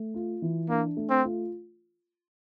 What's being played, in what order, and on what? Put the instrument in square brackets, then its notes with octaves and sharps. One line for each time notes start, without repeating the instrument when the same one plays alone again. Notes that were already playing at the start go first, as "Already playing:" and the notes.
Already playing: [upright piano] A3
F4
E3
[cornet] A#3 [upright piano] D4
[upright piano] A3
[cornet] C4
[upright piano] F4